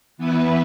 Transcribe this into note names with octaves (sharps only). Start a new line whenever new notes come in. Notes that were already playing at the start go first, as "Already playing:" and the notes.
E3 B3 E4 B4